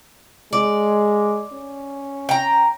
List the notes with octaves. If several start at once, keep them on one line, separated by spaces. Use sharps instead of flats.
G#3 D5
C#4
G5 A#5